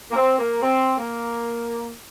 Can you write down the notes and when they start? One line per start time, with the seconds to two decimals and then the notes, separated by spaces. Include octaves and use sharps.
0.11 A#3
0.15 C4
0.39 A#3
0.62 C4
0.98 A#3